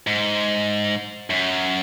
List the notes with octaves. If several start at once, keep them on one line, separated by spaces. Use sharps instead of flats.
G#2
F#2